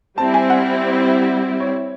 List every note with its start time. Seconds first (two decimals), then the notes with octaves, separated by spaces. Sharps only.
0.18 G3 C4 E4 A5
0.34 G#5
0.50 F#5
1.60 C#5